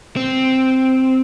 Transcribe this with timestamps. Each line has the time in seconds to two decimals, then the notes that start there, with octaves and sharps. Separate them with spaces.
0.16 C4